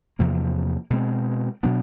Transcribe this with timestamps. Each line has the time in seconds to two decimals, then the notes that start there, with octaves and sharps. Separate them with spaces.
0.19 E2 C3 F3 A#3
0.90 B2 G#3 C4
1.63 B2 F#3 B3 D4